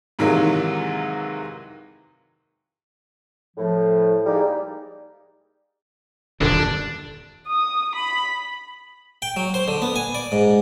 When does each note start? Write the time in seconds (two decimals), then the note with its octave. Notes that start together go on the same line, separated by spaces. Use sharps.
0.19 G#2 C3 D#3 E3 F#3 A#3
3.57 A2 F3
4.26 G3 G#3 A#3 D#4 G4 D5
6.41 D#1 F#2 D3 D4
7.47 D#6
7.95 B5
9.22 G5
9.37 F#3
9.54 C5
9.68 D3
9.82 B3
9.96 G#5
10.15 D5
10.32 G#2